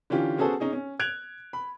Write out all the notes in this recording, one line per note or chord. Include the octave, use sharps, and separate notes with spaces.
D3 E3 C#4 F4 G4
B3 C#4 F#4 G#4 A4 C5
C#4 D#4 G#4
C#4
F#6 G#6 D7 F7
B5